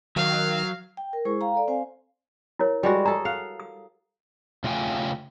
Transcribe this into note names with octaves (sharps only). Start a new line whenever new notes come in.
D#3 F#3 F5
G5
A#4
G#3 E4 G#4 C5 C#6
F5 G5 A#5
A4 D5
C4 C5 F5 G#5
E4 A#4 C#5
G3 G#3 F#4
G#4 A4 A#5
F5 F#5
D#6
C#3 A3 F4 F5 G5 G#5